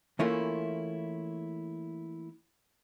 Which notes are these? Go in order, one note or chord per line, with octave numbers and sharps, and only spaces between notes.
E3 A3 A#3 C#4 E4 F4